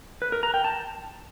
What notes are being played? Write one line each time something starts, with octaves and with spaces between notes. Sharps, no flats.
B4
A#4
A#5
G5
A5